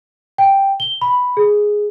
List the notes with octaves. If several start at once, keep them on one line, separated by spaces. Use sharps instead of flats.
G5
G7
B5
G#4